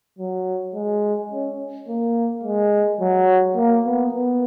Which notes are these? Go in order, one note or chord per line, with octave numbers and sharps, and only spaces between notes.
F#3
G#3
C#4
A#3
G#3
F#3
A#3
B3
B3